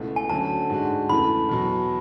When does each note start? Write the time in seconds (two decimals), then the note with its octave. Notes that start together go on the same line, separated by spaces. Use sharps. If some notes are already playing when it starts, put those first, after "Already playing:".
Already playing: C#2 B2 A3 E4
0.16 G#5
0.29 D2 D3 F#3 A3 C#4 A5
0.70 G#2 G#3 D4 F#4
1.09 E2 C#3 E3 A3 B5
1.49 E2 B2 F#3